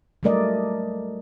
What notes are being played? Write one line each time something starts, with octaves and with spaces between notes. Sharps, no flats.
F#3 G3 A3 A#4 D5 D#5